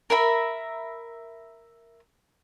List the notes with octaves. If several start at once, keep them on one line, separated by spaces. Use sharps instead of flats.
A#4 E5 B5